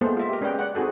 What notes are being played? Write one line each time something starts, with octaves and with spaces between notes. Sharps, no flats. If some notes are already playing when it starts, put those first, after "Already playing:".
G#3 A#3 B3 E4 A4 C5
F4 E5
G4 A#4
G#3 C#4 B4 D5 D#5 G5
D5 F#5
C4 D#4 F#4 G#4 A4